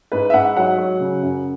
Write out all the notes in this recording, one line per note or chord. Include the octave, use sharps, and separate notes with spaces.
G#2 B4
E5
G#2 F#5
F#3 F#5
F#3
C#3
F#2